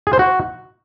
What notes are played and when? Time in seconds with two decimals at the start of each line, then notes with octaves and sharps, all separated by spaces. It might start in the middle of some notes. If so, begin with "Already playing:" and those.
0.07 G#4
0.13 C5
0.19 F#4